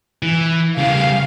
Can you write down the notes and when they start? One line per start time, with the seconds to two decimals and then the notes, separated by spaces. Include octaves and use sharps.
0.23 E3
0.78 C#3 G3 F5